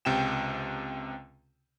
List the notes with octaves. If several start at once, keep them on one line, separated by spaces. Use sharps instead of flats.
C#2 C3 G5 E7